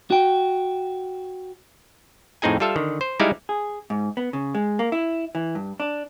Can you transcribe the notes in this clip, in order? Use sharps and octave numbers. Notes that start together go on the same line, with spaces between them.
F#4 G5
F2 A2 C4 D#4 G#4 G#5
G3 F4 A4 E5 F5
D3 D#3
C5
G3 G#3 D#4 E4 D5 F5
G#4
G#2
B3
C#3
G#3
A#3
E4
E3
G2
D4